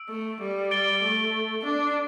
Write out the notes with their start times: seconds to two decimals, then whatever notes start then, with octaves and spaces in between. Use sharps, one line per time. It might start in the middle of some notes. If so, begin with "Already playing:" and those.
Already playing: E6 D7
0.09 A3
0.41 G3
0.71 A6 D7 G7
1.02 A3
1.65 D4